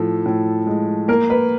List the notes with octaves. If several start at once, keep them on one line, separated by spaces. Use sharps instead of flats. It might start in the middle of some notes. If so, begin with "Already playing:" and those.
Already playing: A2 F3 A4
A2
G#3
A#3 A#4
B4